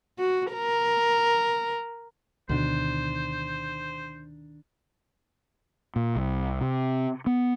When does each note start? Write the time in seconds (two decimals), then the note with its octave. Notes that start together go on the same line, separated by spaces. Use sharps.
0.18 F#4
0.53 A#4
2.49 D2 B2 D3 D#3 D4 C5
5.96 A#2
6.16 C2
6.61 C3
7.26 B3